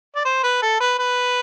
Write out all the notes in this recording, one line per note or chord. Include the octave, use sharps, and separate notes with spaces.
D5
C5
B4
A4
B4
B4